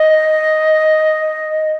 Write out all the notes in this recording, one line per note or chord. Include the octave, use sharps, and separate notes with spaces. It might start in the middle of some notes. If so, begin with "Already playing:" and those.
Already playing: D#5